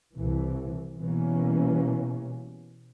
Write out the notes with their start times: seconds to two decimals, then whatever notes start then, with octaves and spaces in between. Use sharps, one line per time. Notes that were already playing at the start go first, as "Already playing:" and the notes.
0.15 C2 E3
0.97 B2 E3 G3 A#3 C#4